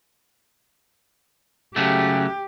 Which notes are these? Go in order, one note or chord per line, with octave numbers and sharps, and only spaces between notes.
C#3 F#3 A3 G4